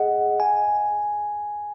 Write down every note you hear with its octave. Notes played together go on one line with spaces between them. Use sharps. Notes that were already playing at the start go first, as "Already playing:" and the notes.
Already playing: G#4 D#5 F#5
G#5